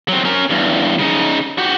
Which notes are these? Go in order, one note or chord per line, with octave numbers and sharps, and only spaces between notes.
F#3 C4
C#4 A#4
E2 G2
C#3 D#4
F#4 G4